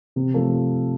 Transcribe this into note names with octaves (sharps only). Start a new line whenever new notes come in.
C3
F3 A3